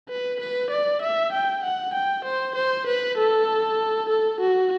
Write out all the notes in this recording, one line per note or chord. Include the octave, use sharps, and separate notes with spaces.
B4
B4
D5
E5
G5
F#5
G5
C5
C5
B4
A4
A4
F#4